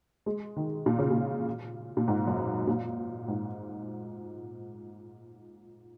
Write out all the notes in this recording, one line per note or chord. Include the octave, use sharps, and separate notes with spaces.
G#3
D#3
A#2
C#3
A#2
A#2
G#2
F#2
A#2
G#2